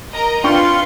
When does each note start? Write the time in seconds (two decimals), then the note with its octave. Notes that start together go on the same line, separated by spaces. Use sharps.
0.13 A#4 D#5 A#5
0.44 D4 F4 B4 G5 C6 C#6 C#7